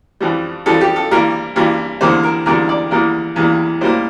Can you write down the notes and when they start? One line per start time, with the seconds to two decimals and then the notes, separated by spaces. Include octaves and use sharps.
0.21 F2 E3 G3
0.66 F2 E3 G3 A4
0.81 G4
0.96 A4
1.11 G2 E3 G3 A#3 A#4
1.56 G2 E3 G3 A#3
2.01 E2 D3 G3 A#3 C5
2.23 A#4
2.46 E2 D3 G3 A#3 A#4
2.69 D5
2.91 E2 E3 G3 A#3 A#4
3.36 E2 E3 G3 A#3
3.81 A2 G3 A#3 C5